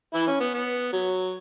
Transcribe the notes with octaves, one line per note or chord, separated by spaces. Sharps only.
E3 E4
C#4
B3
B3
F#3